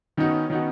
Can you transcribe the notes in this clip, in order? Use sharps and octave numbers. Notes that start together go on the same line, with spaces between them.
D#3 B3 C#4 D#4 F#4
D#3 B3 D#4 F#4